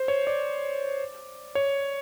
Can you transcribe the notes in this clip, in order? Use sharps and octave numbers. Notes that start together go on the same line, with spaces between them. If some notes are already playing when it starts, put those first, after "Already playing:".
Already playing: C5
C#5
D5
C#5